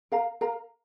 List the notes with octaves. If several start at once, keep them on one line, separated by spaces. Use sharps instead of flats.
A#4 F5 A#5
A#4 F5 A#5